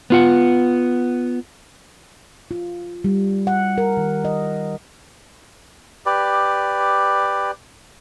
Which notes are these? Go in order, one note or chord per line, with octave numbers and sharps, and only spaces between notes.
B3 F4 F#5
F4
G3
F#5
A#4
D#3
D#5
G4 B4 D5